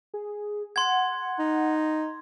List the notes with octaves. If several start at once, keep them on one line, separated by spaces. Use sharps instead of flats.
G#4
F#5 C6 G#6
D#4